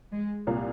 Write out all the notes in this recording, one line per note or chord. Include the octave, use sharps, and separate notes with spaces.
G#3
C2 A#2 A#3